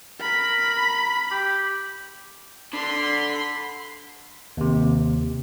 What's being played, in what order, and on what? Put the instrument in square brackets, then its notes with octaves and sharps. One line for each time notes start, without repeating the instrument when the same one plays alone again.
[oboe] A#4 [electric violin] B5
[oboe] G4
[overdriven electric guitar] D3 [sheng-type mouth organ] B5 [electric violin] C6
[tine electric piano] D#2 C3